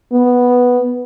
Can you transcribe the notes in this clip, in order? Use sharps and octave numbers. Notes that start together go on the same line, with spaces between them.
B3